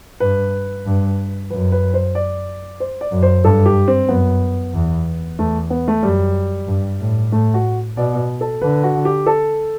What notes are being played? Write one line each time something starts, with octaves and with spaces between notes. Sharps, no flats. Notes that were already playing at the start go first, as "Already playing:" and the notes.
G2 B4
G2
F#2 B4
B4
C5
D5
C5
D5
F#2
C5
G2 A4
G4
C4
F#2 B3
E2
E2 A3
B3
A3
F#2 G3
G2
A2
A2 A3
F#4
B2 D5
A4
D3 B4
F#4
G4
A4